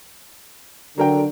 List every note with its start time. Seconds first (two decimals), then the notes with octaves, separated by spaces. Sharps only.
0.98 D3 F#3 A#4 G5